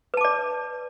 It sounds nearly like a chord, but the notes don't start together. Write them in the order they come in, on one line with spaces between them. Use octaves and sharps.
B4 A5 D6 D5